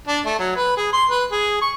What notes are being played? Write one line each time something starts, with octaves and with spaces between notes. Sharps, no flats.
D4
A3
F#3
B4
G#4
C6
B4
G#4
C#6